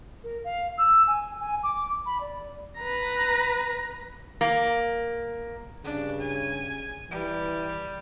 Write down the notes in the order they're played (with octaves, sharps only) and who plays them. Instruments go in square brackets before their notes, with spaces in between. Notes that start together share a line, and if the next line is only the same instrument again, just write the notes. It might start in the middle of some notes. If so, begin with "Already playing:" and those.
[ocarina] A#4
F5
E6
G#5
G#5
D6
B5
D5
[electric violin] B4 A#5
[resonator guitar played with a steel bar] A#3
[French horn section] G2 C#3 [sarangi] D4
[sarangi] G#5
[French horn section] E3 [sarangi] G3